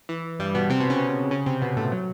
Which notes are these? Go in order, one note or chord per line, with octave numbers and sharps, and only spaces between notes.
E3
G2 G3
B2 B3
C3 C4
B2 B3
C#3 C#4
C#3 C#4
C3 C4
B2 B3
A2 A3
F#3